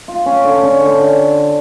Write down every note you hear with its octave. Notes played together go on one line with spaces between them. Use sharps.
F4
C#4
D3
C#4
D3
D3